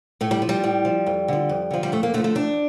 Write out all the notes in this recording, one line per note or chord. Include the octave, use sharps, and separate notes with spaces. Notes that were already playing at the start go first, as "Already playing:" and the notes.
A2 A3
G3
F3
G3
A2
F3
F2
D3 F3
F2
D3 F3
G3
F2 A3
A#3
D3 F3 A3
A3
F2 D4